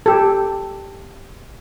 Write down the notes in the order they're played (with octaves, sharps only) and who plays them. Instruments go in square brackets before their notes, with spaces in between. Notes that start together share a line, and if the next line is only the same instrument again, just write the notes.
[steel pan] G4 A4